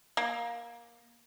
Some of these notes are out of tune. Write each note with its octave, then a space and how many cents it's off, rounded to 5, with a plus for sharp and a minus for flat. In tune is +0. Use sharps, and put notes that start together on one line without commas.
A#3 +15